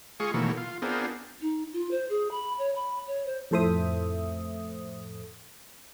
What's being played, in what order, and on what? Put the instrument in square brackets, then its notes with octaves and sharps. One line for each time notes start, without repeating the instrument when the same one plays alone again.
[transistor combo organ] G#3 F4 G#4 C#6
B2 D#3 E3 F#3 A3 A#3
F4
B3 C4 D4 F4 G#4 A#4
[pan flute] D#4
F4
C5
G#4
B5
C#5
B5
C#5
C5
[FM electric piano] F2 A2 A4 C5 E5 D#6